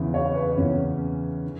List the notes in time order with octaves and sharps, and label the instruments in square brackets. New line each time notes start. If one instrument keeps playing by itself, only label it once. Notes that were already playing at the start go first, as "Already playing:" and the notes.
Already playing: [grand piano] E2 C#3 E3
[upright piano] C#5
B4
[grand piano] E2 C#3 E3 [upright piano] C#4
[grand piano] D3